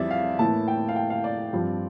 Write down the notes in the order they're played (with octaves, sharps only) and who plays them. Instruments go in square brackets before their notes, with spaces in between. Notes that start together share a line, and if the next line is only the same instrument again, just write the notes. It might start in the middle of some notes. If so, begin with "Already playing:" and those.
Already playing: [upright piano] F2 E3 G3 C4 D5 E5
F5
A2 E3 A#3 E4 A5
G5
F5
G5
F5
D5
G2 F3 C4 F4